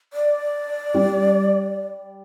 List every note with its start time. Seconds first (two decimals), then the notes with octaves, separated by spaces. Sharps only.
0.13 D5
0.94 G3